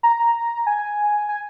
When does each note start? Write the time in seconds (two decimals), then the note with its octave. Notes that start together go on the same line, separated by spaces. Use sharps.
0.03 A#5
0.66 G#5
1.29 G#5